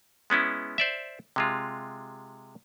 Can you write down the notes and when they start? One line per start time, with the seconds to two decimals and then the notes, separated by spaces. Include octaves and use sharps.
0.30 G#3 B3 C#4 E4
0.78 C5 D5 E5
1.36 C3 G#3 F4